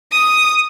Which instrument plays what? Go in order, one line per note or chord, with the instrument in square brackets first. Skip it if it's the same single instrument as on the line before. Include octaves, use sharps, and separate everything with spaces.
[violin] D#6